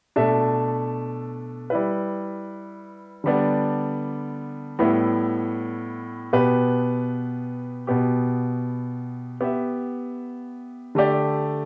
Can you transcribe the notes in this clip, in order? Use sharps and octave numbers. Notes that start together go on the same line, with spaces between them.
B2 A3 D4 A4 E5
G3 E4 B4
D3 G3 B3 D4
A2 G3 B3 E4
B2 B3 G4 B4
B2 B3 G4
B3 G4 E5
D3 A3 G4 D5